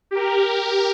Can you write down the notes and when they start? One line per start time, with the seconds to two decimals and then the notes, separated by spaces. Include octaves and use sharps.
0.11 G4 A#4